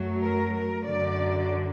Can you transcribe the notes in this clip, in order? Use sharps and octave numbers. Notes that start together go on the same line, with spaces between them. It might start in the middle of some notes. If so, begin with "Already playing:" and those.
Already playing: F#2 F#3 A3
A#4
A#4
F#2 D3 F#3 D5